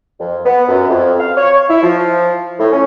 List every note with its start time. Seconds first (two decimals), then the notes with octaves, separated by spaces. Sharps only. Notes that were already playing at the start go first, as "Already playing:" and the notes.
0.20 F2
0.44 B3
0.69 F#2
0.89 F2
1.19 F5
1.37 C#5
1.69 E4
1.82 F3
2.59 A2
2.71 C#4